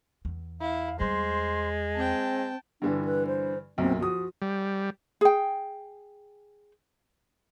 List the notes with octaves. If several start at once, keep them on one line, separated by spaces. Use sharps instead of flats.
E2
E4 F5
E2 G3 G#3 C5 C6
C4 G5 A5
G2 D3 E3 D4
B4
C5
B1 F#2 A#2 C4
F3 F#4 D#6
G3
G#4 G5